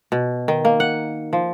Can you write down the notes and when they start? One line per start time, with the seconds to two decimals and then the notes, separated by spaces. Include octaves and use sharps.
0.12 B2
0.48 D#3
0.65 A#3
0.80 F#5
1.33 F3